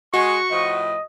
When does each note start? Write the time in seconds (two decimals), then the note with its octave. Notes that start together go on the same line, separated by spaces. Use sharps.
0.14 G#3 F#4 C#6
0.50 A2 F3 D#5